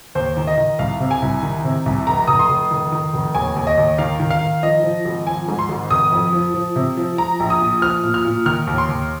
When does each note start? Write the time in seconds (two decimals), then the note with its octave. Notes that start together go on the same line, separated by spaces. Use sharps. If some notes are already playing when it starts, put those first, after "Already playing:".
0.15 D#2 C5
0.37 D#3
0.47 D#5
0.58 D#3
0.79 C2 F5
1.00 C3
1.11 G#5
1.22 C2
1.43 D#3
1.64 C3
1.86 C2
2.07 F1 A#5
2.27 F1 D#6
2.39 C6
2.49 F1
2.71 D#3
2.92 D#3
3.13 F1
3.35 D#2 G#5
3.56 D#2
3.67 D#5
3.77 D#2
3.98 D#3 F5
4.20 D#3
4.30 F5
4.41 D#3
4.63 F3 D#5
4.83 F3
5.05 G#1
5.27 F3 G#5
5.48 G#2
5.59 C6
5.69 G#1
5.91 F1 D#6
6.12 F2
6.33 F3
6.54 F3
6.76 C3
6.97 F3
7.18 F3 A#5
7.40 A#1
7.50 D#6
7.61 A#2
7.82 F3 F6
8.03 A#2
8.14 F6
8.25 A#2
8.46 D#3 F6
8.67 D#2
8.78 C6
8.89 D#2